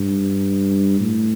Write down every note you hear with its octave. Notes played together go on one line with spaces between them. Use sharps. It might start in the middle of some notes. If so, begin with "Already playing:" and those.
Already playing: G2
A2